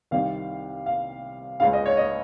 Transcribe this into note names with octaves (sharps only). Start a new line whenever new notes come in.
C2 C3 D#3 F5
F5
C#2 C#3 F5
D#5
C#5
D#5